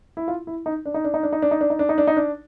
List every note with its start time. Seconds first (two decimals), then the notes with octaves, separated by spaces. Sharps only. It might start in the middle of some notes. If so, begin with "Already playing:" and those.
0.17 E4
0.28 F4
0.47 E4
0.66 D#4
0.85 D4
0.94 D#4
1.04 D4
1.14 D#4
1.23 D4
1.33 D#4
1.42 D4
1.51 D#4
1.61 D4
1.70 D#4
1.79 D4
1.89 D#4
1.98 D4
2.07 D#4
2.17 D4